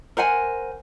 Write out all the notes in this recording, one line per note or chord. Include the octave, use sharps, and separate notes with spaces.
A#4 C5 F#5 G#5